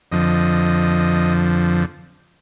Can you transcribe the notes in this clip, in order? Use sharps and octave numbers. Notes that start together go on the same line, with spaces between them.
F2 D3 F3 D#5